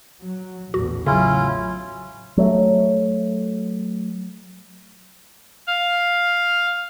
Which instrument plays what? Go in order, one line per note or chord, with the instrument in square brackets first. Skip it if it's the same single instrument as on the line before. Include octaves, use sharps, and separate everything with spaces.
[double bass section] F#3
[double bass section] A#1 E2 A2 [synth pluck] F#4
[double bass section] A1 F#3 [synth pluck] C#3 [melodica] C#4 E4 F4
[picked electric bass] F#3 A3
[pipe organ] F5